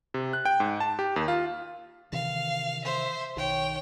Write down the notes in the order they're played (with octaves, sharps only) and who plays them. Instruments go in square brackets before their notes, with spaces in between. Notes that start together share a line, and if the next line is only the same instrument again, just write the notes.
[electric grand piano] C3
F#6
G5
G#2
A5
G4
D#2
F4
[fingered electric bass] C3 D#3 E3 [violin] F5
[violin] C5 E5
[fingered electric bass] B1 D#3 [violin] C#5 G5